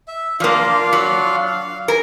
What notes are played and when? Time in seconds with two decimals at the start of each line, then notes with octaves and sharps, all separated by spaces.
0.08 E5
0.40 F3 A#3 D4 F4 F5
0.93 F#3
1.48 F5
1.88 A#4 G#5